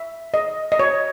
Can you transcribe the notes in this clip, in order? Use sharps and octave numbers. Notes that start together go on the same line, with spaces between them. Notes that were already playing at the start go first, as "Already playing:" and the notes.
Already playing: E5
D#5
D#5
C#5